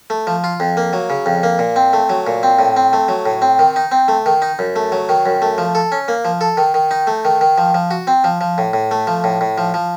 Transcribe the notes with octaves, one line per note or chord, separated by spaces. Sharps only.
A3
F3
F4
F2
A#3
F#3
C#3
F2
A#3
A#2
C4
A3
F#3
A#2
C4
A2
C4
A3
F#3
A2
C4
D#3
D#4
C4
A3
D#3
D#4
F#2
A3
F#3
D#3
F#2
A3
F3
A4
C#4
A#3
F3
A4
D#3
D#3
D#4
A3
D#3
D#3
F3
F3
F#4
C4
F3
F3
A2
A2
A3
F3
A2
A2
F3
F3